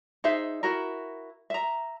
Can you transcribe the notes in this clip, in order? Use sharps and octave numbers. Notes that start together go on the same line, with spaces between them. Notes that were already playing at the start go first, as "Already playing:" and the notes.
D#4 G#4 C5 E5
E4 F#4 A#4
E5 A#5